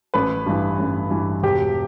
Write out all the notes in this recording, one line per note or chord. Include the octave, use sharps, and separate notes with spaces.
A1 B4
G2 E3
A1
G2 E3
E1 G4